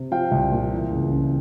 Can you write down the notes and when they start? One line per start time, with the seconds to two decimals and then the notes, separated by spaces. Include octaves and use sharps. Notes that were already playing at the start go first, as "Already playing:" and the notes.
Already playing: C3
0.11 F3 F5 G5
0.31 C2
0.52 A#2
0.72 E3
0.91 C#2
1.12 C#3